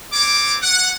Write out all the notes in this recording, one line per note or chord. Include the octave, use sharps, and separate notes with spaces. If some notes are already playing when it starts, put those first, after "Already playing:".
C4 C#5 D6
F#5